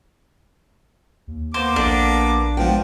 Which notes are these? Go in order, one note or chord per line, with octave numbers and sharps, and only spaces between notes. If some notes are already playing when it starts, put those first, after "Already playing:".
D#2
A#3 B3 C5 D6
A#1 D4 A4
F3 G#3 B3 G5